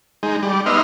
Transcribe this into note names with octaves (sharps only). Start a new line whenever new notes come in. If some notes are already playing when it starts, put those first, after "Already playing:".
G#3 D#4
G3 D5
B3 D#4 D#5 E5 C6 F6